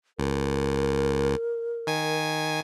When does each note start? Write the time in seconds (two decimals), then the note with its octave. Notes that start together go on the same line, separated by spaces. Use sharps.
0.19 C#2 A#4
1.87 D#3 G#5